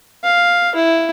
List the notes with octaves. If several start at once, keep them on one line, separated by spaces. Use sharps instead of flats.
F5
E4